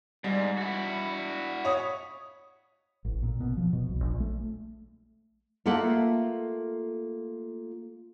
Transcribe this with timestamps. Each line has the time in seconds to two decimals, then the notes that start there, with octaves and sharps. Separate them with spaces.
0.24 G#2 G3
0.57 E4 F#4
1.65 C#5 D#6
3.05 A1
3.23 A#2
3.40 B2
3.57 F3
3.73 B2
3.88 C2
4.01 A#1
4.20 A3
5.66 A3 A#3 F4 A4 E5 F#5